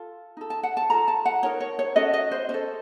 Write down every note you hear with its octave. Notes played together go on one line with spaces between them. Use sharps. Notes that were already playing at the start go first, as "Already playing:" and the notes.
Already playing: F4 A4
D#4 A4
A5
F#5
A5
F4 A4 A#5
A5
F#5
D#4 A#4 C#5
C#5
C#5
C#4 F#4 A4 D#5
D#5
C5
C#4 A4 C5